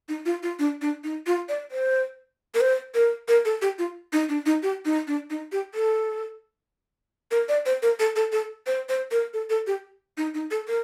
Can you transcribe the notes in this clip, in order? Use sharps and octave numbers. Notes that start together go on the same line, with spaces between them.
D#4
F4
F4
D4
D4
D#4
F4
D5
C5
A#4
C5
A#4
A#4
A4
G4
F4
D#4
D4
D#4
G4
D#4
D4
D#4
G4
A4
A#4
D5
C5
A#4
A4
A4
A4
C5
C5
A#4
A4
A4
G4
D#4
D#4
A4
A#4